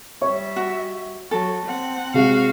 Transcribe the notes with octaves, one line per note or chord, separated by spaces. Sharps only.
G3 C#5 E5 C#6
F#4
F#3 A4
C4 F#5
C3 G#3 F#4 F5